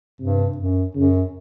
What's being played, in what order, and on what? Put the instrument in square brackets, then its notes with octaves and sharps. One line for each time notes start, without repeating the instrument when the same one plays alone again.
[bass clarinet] G2 [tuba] C3
[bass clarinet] F#2
[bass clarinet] F#2 [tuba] C#3